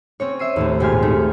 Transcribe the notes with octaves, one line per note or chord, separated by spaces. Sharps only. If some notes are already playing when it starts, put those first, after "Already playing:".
C4 C#4 C#5
E5 E6 C7 D#7
D#2 A2 A3
G#1 A#2 G4 G#5 C6 F6
A3 D#4